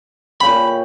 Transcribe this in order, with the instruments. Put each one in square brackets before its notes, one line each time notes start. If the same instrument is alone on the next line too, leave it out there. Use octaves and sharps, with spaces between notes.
[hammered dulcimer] A#2 C#3 G5 [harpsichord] B5